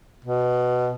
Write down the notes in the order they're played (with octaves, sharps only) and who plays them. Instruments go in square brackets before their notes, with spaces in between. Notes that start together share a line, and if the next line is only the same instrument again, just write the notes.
[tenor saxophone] B2